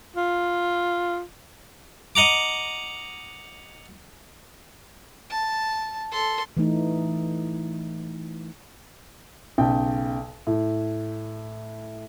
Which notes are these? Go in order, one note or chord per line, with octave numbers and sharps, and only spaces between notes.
F4
D#5 F#5 A#5 D6
A5
A4 C6
E3 A3 D#4
B1 C#3 G5
A2